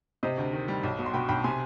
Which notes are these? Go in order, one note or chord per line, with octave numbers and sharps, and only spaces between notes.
C3 C5 D#5
D2
D#3
G3
B1
B2
C6
B2 G5 B5
B1 G5 B5
C3 G#5 C6